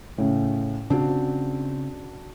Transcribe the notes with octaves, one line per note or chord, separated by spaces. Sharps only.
A2 C#3
C#3 C4 D4 F#4